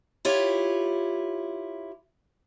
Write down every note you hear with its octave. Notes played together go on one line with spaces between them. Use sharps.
E4 F4 G4 C#5